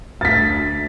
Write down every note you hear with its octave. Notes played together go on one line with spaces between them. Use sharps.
D2 A6 B6